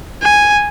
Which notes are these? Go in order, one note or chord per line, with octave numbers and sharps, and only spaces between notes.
G#5